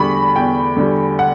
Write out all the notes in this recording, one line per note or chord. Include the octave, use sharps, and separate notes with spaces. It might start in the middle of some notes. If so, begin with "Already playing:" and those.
Already playing: E2 D3 G3 B5 C#6
E2 G5
D3 G3
F#5